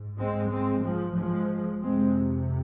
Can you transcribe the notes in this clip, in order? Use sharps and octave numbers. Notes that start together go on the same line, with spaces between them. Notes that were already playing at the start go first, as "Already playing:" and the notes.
Already playing: G#2
G#3 C4
G#3 C4
F3 G#3
F3 G#3
F2 C3 G#3 C4